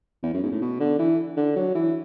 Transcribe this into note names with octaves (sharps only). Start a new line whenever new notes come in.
E2
F#2
G#2
A2
B2
D3
E3
D3
F#3
E3